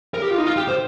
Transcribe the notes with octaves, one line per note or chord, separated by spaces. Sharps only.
A#4
G4
F4
D#4
F4
G4
C5